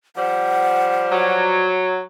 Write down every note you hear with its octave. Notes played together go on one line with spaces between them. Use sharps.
F3 G3 C5 F#5
F#3